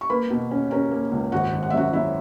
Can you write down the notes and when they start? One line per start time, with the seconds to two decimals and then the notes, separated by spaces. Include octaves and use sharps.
0.01 C#6
0.10 A#3 B4 B5
0.30 B2
0.51 C#4
0.71 C#4 A#4 A#5
0.91 A#3
1.12 C#2
1.32 G#1 F#4 F#5
1.53 G#1
1.63 F#5
1.70 E5
1.73 F#2 F#4 F#5
1.93 F#3 E4 E5